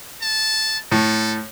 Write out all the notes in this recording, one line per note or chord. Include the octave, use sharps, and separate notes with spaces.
A5
A2 A4